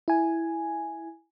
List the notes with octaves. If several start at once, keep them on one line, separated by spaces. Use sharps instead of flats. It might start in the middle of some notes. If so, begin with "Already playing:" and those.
E4 G#5